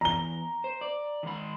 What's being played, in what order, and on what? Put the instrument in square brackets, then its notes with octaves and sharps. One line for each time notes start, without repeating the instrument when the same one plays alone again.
[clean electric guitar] E2 [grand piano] A#5 G7
[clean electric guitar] C5
D5
D#3 G#3 B5